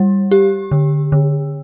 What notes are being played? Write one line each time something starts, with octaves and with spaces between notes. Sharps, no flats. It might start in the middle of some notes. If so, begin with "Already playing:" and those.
Already playing: G3
G4
D3
D3